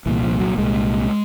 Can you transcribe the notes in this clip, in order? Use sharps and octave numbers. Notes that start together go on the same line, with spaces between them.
C2 A#2 E3
F3
F#3
C2 A#2 G#3